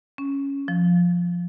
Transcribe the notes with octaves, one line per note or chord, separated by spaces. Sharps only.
C#4
F3